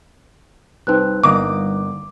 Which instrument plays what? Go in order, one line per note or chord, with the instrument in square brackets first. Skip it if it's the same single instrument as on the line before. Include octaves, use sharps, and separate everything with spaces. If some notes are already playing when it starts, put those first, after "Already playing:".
[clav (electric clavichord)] C2 C4 [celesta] D#4 B4 F#6
[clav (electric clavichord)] G1 A#3 D#5 [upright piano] D6